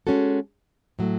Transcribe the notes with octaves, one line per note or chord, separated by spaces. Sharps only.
G#3 C#4 F#4 A4
A2 F#3 A3